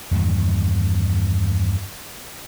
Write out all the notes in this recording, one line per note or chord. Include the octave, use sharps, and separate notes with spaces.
E2 G2 A#2 D#3